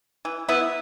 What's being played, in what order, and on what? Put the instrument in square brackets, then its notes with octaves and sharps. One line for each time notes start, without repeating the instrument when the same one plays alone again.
[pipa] E3
B3 E4